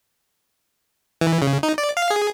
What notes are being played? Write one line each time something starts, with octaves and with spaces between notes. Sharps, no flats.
E3
C#3
D#4
D5
F5
G#4